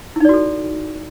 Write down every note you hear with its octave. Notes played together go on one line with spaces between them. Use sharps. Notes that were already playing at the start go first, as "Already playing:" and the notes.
D#4 E4 F#4 A4 D5